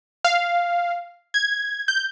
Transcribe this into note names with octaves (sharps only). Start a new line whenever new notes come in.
F5
G#6
G6